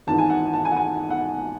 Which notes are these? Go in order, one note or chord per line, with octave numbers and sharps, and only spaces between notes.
G#1 G#2 E3 A5
G#5
F#5
A5
G#5
F#5
G#5
F#5